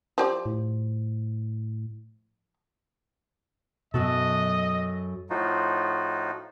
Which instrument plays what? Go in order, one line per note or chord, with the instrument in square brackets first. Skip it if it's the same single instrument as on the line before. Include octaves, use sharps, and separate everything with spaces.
[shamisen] F3 G4 D5
[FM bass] A2
[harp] F#2 F#4 A4 [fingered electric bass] B2 B3 [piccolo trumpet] D#5
[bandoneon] A2 F3 D#4 F4 F#4